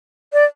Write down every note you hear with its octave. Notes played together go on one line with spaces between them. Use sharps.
D5